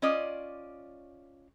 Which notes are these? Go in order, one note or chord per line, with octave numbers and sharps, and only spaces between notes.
C#4 F4 D5 D#5